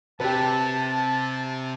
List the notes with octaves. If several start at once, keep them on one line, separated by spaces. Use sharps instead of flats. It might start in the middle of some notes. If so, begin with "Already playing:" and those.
C3 G4 B4 A5